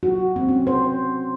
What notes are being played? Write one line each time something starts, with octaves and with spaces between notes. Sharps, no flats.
F#4
C4
C#4
C5